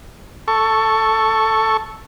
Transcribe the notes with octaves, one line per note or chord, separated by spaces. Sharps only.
A4 C#6